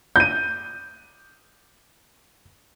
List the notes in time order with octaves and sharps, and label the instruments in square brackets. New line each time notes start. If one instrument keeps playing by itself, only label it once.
[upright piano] G6 D#7